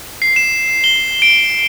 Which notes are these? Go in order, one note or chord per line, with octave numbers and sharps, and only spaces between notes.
C7
E7
G7
D7